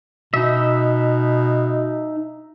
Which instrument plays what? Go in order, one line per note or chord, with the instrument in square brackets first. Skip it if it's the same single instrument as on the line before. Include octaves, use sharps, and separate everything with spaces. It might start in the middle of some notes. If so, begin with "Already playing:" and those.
[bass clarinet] B2 [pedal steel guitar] D#4 E5